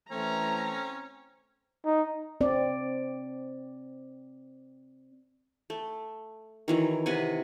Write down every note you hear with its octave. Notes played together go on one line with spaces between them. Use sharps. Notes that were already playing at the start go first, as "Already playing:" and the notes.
E3 A3 C4 C#4 A#5
D#4
C4 D5
A3
D#3 E3 F#3
C3 B4 F#5 G#5